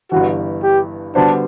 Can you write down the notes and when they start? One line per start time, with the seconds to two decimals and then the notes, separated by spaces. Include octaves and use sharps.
0.12 G1 G2 E3 F#4
0.63 G4
1.15 D3 G3 B3 D4 F#4 C5